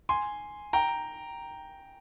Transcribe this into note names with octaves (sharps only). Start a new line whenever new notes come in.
G#5 C6
G5 A#5